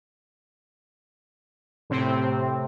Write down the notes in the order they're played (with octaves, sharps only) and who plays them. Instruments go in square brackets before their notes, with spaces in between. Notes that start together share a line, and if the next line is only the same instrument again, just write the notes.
[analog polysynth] A2 C3 C4